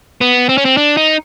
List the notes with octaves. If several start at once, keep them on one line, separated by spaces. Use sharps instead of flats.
B3
C4
C#4
C4
D4
D#4